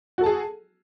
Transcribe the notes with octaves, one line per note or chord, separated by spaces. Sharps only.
F#4 G#4 A4 A5